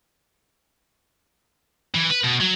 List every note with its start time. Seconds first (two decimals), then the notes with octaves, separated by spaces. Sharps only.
1.94 E3
2.10 B4
2.24 B2
2.40 F#3